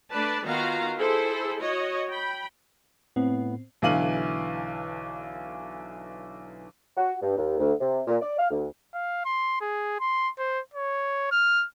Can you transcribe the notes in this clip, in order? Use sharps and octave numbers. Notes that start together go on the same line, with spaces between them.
A3 D4 B4 D5 A5
D#3 B3 F4 F#4 F5 A#5
E4 G#4 A4 C5
F#4 C#5 D#5
G5 B5
A2 B3 C4
B1 D3 E3 F5 D#7 F#7
F#4
G2
D#2
D2
C3
A#2
D5
F5
D2
F5
C6
G#4
C6
C5
C#5
F6